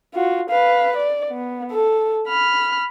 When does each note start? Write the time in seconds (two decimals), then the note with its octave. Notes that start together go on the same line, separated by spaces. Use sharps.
0.14 F4 F#4
0.49 B4 F5
0.96 D5
1.29 B3
1.71 A4
2.27 B5 F6